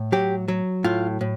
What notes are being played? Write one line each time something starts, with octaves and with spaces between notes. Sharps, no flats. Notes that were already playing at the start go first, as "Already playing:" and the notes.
Already playing: A2
F#3 G4
F#3
A2 F4
A2